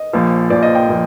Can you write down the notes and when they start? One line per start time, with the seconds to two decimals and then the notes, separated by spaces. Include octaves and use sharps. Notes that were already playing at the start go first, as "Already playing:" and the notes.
Already playing: D#5
0.13 A#1 A#2 F3
0.50 A#1 A#2 F3 D5
0.63 D#5
0.75 G5
0.88 A#2 F3